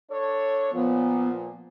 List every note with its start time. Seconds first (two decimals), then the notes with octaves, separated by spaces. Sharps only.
0.11 D4 A4 C#5
0.74 A#2 F3 B3